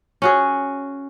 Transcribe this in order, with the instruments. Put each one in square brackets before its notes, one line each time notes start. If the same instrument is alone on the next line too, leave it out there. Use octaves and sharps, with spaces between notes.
[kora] C#4 F#4 G#4